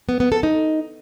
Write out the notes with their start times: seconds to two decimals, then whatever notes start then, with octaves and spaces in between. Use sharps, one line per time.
0.09 B3
0.20 B3
0.32 A4
0.43 D#4